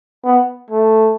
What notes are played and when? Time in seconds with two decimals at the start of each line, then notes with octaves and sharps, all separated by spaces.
0.25 B3
0.71 A3